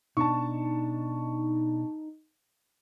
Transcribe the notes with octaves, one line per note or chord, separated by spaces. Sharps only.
B2 D4 D#4 A5 C#6